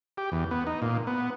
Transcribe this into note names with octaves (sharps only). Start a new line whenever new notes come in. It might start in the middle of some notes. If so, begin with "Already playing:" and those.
G4
E2
B3
D#4
A#2
B3